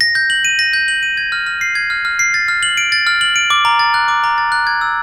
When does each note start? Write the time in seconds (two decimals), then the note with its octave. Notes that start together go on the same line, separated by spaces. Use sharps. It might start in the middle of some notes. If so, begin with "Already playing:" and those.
0.01 A#6
0.15 G6
0.30 F#7
0.45 D#7
0.59 A#6
0.73 G6
0.88 F#7
1.03 D#7
1.17 G#6
1.32 F6
1.47 F6
1.61 C7
1.75 G#6
1.90 F6
2.05 F6
2.19 C7
2.34 A6
2.48 F6
2.63 F#7
2.77 D7
2.92 A6
3.07 F6
3.21 F#7
3.36 D7
3.50 D6
3.65 A#5
3.79 A6
3.94 F#6
4.08 D6
4.24 A#5
4.38 A6
4.52 F#6
4.67 G#6
4.81 E6